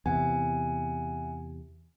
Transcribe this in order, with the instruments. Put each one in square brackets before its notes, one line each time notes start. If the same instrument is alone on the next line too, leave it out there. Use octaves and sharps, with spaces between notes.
[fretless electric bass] E2 C3 [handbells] E5 F#5 G#5